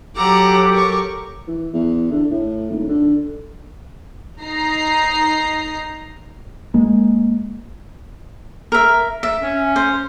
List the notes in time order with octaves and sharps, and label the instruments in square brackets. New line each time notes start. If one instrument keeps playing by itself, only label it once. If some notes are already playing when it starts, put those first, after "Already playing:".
[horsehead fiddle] F#3 G4 [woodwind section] A4 D6 [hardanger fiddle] F#5 A#5
[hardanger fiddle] A#4 C#6
[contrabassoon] E3
E2
D3
A2
D#1
D3
[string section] D#4 A#5 C7
[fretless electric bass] G#3 A#3
[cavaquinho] A#4 E5
E5
[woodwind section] C#4
[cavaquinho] C5